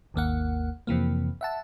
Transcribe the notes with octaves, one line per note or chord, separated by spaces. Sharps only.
G#1 D#2 A#3 F#5
F2 C3 E3 A#3
E5 F#5 A5